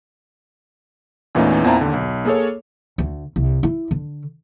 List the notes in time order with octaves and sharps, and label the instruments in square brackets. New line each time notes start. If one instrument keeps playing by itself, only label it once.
[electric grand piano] E2 A#2 E3 A3 C#4 D#4
E2 A#2 C4 E4 A5 A#5
D#2 D3
B1
A#3 G#4 A4 C#5
[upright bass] D2
C2
E4
D3